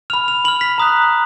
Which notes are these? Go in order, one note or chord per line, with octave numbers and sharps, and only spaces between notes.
B5 F6 F7
F7
B5 F6 F#7
B6
A#5 D#6 F#6